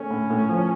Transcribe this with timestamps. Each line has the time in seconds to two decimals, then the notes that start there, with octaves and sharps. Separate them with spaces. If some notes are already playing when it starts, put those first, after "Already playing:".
Already playing: A3 C#4
0.11 A2
0.30 A2
0.49 F3